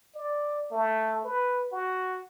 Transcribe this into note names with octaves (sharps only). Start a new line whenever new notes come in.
D5
A3
B4
F#4